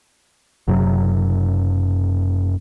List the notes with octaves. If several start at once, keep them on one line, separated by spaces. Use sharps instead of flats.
F#1 F#2 C3 F#3